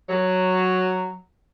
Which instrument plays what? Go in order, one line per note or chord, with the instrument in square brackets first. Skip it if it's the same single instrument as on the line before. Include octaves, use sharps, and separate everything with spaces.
[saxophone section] F#3